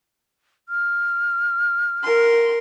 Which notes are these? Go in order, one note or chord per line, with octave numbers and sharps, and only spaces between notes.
F6
A#4 C6